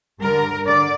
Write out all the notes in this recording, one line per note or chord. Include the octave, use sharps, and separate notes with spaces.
G2 D3 A#4
D3 D5